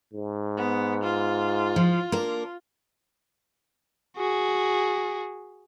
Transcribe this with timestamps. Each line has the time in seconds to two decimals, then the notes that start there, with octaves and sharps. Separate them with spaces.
0.14 G#2
0.57 B3
1.04 F4
1.76 F3
2.12 A#3 D4 A#4
4.17 F#4 G#4